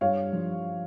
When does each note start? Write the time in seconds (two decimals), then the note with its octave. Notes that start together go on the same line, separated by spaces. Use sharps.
0.01 G2 C#5 F5
0.33 F3